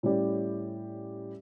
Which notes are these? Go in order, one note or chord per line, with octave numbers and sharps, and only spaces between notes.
A2 G3 C#4 G4 D5